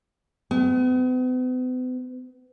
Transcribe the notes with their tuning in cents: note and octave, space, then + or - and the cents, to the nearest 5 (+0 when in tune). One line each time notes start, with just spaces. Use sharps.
B3 +45